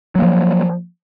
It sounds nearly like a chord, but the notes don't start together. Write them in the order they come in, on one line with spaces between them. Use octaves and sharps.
F#3 A#3 F3